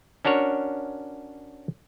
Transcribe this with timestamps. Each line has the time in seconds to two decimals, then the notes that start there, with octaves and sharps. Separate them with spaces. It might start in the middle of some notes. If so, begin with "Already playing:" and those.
0.25 C#4 D4 F#4 A#4 C#5